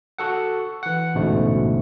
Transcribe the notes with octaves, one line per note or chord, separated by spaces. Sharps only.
F#4 A4 F#5
E3 F#5
A1 D2 G#2 B2 A3